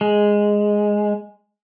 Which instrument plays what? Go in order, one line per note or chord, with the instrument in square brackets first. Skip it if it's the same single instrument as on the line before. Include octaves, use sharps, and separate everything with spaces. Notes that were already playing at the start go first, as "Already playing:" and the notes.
[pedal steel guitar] G#3